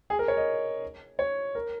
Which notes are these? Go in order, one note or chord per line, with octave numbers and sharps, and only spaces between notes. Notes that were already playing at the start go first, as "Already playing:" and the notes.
G#4
A#4
C#5
D#5
C#5
A#4